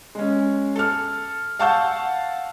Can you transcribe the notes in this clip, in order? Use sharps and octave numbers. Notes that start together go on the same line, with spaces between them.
G#3 C#4
A4 F6
F5 F#5 A5 C#6 E6 G6